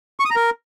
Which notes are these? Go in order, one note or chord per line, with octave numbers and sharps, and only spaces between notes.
C#6
D#6
A#5
A#4